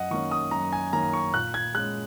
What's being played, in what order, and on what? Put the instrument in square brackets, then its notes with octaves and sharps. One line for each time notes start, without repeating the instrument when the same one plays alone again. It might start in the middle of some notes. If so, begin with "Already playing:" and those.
Already playing: [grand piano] F#2 D#5 F#5
D#3 A#3 C#4 C#6
D#6
F#2 A#5
G#5
D#3 A#3 C#4 A#5
C#6
A#2 F#6
G#6
G#3 C#4 F#6